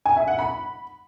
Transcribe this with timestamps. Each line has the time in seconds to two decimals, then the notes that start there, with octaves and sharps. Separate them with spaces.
0.06 G#5
0.16 E5
0.27 F#5
0.38 B5